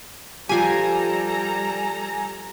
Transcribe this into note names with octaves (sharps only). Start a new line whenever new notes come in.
F3 G3 G4 A4 G#5 A#5